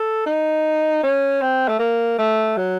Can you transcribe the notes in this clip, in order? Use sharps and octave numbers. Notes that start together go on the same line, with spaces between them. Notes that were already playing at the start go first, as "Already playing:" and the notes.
Already playing: A4
D#4
C#4
C4
A3
A#3
A3
F#3